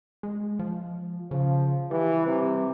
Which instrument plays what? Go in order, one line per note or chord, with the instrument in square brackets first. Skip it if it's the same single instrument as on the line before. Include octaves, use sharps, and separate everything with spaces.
[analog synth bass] G#3
F3
[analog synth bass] C#3 [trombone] F3
[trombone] E3 [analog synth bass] G3
[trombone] C3